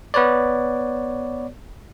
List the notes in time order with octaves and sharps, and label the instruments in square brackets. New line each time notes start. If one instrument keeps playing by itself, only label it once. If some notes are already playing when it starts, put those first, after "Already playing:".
[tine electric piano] B3 B4 C#5 D5